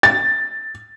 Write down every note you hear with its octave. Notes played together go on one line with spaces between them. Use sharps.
A6